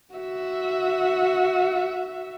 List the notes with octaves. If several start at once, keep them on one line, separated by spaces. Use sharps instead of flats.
F#4 E5